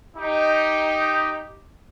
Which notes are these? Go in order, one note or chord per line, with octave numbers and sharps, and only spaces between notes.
D#4 G4